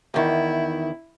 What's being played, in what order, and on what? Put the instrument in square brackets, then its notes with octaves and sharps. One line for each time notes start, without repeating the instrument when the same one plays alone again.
[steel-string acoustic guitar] E2 D#3 [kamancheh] E4